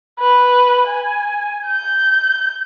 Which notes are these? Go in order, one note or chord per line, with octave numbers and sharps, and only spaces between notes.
B4
G#5
G6